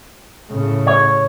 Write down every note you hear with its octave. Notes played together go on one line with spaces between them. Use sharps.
A2 C#3
C#5